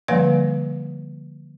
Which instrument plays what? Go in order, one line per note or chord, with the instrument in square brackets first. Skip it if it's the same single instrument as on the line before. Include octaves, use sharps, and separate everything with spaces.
[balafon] D3 F3 G3 A#3 B4 F5